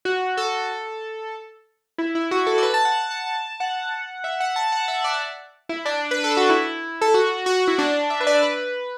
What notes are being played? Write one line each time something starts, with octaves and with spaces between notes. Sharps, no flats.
F#4
A4
E4
E4
F#4
A4
D5
B4
A5
F#5
A5
A5
F#5
E5
F#5
A5
F#5
E5
D5
E4
D4
B4
A4
F#4
E4
A4
F#4
F#4
E4
D4
E5
B4
D5
B4